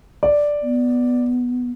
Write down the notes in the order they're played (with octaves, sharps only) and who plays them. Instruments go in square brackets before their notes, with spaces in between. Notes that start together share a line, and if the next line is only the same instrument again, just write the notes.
[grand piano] D5
[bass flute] B3